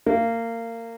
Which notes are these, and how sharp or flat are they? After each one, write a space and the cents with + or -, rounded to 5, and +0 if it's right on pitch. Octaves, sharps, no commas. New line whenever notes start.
A#3 -25